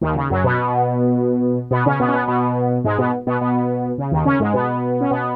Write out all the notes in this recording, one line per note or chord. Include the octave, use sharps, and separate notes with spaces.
D#2 D#3
C#3
F#2 F#3
B2 B3
B2 B3
C#3 C#4
B2 B3
C#4
B2 B3
B2 B3
G#2 G#3
B2 B3
B2 B3
B2 B3
C#3
D#2 D#3
C#3 C#4
G#2 G#3
B2 B3
C#4
B2 B3